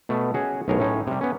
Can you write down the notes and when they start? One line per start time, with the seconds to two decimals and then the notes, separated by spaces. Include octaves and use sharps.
0.09 B2 A3
0.34 C#4 F#4 G#4
0.68 B1 A2 G#4 A#4 C#5
0.79 A2 C#4 D#4
1.07 C3 G3
1.21 B3 C#4